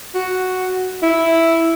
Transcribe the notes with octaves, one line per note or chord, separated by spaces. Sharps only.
F#4
E4